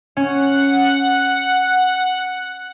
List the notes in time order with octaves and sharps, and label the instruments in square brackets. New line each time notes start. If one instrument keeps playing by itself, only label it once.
[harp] C#4 [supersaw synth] F#5